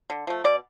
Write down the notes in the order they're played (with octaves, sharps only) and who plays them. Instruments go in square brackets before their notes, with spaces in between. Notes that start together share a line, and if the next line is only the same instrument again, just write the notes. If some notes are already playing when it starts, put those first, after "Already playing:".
[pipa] D3
F3 A3
B2 D5